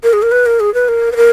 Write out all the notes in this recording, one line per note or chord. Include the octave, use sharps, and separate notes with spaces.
A#4
G#4
A#4
B4
A#4
G#4
B4
A#4
B4
A#4